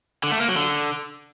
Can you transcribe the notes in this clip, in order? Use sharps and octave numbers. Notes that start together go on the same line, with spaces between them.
D3
A3
A#3
F#3
D3